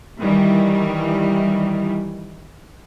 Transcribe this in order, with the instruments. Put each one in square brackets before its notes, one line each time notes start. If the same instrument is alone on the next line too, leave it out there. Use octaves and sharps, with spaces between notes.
[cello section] D#3 E3 G3